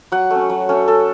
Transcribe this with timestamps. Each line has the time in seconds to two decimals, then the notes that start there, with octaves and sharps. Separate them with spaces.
0.12 F#3 F#5
0.30 A3 C#4
0.50 F#3
0.69 A3 C#4
0.88 A3 A4